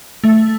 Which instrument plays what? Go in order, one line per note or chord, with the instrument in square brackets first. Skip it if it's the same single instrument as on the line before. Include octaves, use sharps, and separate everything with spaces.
[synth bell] A3